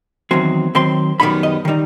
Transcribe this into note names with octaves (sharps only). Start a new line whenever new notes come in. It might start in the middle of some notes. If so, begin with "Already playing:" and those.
E2 D#3 F#3 C4
D#3 F#3 C4 C6
F#2 D#3 G3 B3 D#4 B5
D#5
D#3 G3 D#4